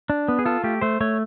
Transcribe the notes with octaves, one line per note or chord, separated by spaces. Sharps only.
D4
B3
G#4
F4 A4
A3 G4
A3 C5
A3 C#5